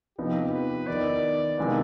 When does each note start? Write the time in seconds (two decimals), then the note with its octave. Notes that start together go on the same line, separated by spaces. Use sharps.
0.18 C3 F3 B3 D#4 G4
0.53 B4
0.87 D#3 B3 D#4 D5
1.57 C3 D#3 G#3 B3 F4